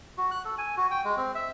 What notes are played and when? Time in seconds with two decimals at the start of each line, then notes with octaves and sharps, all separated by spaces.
0.18 F#4
0.31 F#6
0.45 A4
0.58 G#5
0.77 F#4
0.91 G5
1.05 G#3
1.17 C4
1.35 E5